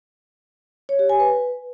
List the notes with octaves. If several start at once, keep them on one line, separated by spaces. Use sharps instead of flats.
C#5
G4
G#5
B4